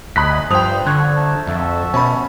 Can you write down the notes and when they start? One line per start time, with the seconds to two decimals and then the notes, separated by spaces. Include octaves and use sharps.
0.16 D2 D#5 G#5 B5 D#6 F#6 B6
0.50 G2 F3 C5 G5 D#6 F7
0.86 D3 C#6 F#6 G#6
1.15 A3 D#4 A5
1.47 F2 F#4 A4 E5
1.94 B2 C#4 A5 B5